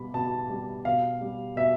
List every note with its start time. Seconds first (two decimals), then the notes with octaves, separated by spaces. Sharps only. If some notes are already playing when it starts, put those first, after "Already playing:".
Already playing: B2 G3 B5
0.14 B2 A5
0.49 G3
0.85 B2 F5
1.21 G3
1.56 B2 E5